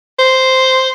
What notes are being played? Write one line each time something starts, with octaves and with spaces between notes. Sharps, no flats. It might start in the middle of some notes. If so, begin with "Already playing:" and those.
C5